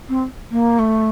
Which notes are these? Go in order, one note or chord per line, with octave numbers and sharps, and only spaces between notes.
C4
A#3
A3